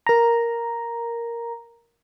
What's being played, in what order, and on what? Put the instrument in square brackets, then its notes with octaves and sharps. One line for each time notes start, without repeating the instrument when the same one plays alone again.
[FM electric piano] A#4 A#5